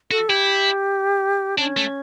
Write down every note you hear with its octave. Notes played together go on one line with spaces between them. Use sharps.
F#4 A4
E4 G4
C#4 D4
A3